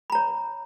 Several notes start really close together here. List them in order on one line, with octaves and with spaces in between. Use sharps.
B5 A#5 C#5